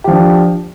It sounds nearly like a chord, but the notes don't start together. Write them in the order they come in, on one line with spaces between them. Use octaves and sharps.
G4 F3 D4